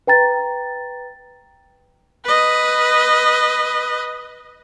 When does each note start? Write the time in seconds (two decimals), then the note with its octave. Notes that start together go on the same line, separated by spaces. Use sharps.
0.07 B4 G5 A#5 A6
2.25 B4 D#5